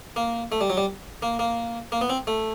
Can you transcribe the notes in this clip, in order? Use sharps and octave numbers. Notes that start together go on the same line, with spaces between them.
A#3
A3
G3
F#3
G3
A#3
A#3
A#3
B3
C4
A3